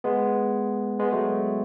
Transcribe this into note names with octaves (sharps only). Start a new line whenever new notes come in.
G#3 B3
G#3 B3
F#3 A3